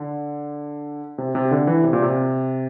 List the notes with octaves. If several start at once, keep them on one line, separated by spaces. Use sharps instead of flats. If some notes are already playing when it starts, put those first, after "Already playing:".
Already playing: D3
C3
C3
D3
E3
C3
A#2
C3